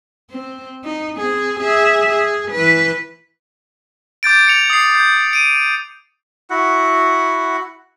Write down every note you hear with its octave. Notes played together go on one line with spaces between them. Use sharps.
C4
D#4
C4 G#4
G#4 E5
G#4
E3 B4
D6 G6 A6 D7
C#7 F7
D#6 C7
G6 C7
D7 D#7
E4 F#4 F#5